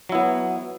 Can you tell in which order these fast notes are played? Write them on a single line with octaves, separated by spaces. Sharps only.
F#3 E4 B3